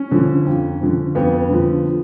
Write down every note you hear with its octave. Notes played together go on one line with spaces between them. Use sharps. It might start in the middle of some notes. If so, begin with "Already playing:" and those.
Already playing: C#4
D3 F3
F2
D3 F3
F2 B3
D3 F3